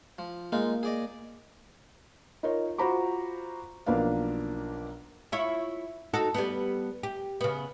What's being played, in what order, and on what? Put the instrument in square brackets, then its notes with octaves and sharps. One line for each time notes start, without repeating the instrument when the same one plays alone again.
[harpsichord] F3
[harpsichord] G#3 D#4 F4 [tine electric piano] A#3
[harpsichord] G#4 D5 D#5
[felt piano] D#4 F4 A#4 C#5
F4 F#4 C5 A#5 B5 D6
B1 F3 A#3 D4 B4 F5
[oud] E4 F4 C#5
D#4 F#4 A4
G3 B3
G4
C#3 B3